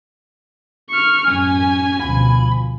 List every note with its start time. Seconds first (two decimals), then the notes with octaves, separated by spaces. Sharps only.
0.91 C#6 F6
1.29 A1 F#2 C#4 G#5
2.00 D2 B2 F3 B5